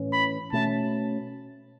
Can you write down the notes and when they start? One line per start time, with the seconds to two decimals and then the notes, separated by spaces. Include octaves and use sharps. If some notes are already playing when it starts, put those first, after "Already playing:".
Already playing: A2 E3 C#4
0.13 B5
0.53 B2 A3 C#4 A5